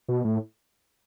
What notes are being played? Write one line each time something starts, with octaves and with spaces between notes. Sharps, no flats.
B2
A2